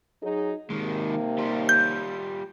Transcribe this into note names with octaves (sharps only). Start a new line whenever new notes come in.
F#3 D#4 G#4
D#2 C3 D#3 G#3 A#3
G3 F4
G6